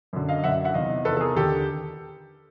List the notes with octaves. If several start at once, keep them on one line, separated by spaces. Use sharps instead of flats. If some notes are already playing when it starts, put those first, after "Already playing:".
F#2 D3
D#5 F5
F#2 D3 E5 F#5
E5 F#5
E2 C3 D#3 D#5 F5
E2 C3 D#3 A4 B4
A4
G#4 A#4
D#2 D3 G4 A4